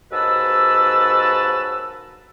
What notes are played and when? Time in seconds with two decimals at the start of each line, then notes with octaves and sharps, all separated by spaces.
0.12 D#2 G#2 F#4 B4 A5 E6